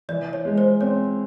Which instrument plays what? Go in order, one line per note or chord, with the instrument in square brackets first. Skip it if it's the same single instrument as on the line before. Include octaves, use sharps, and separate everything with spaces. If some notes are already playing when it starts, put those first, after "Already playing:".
[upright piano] E3 [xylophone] D5
[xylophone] C#5
[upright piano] G#3
[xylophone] C5
[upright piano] C4 [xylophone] C#5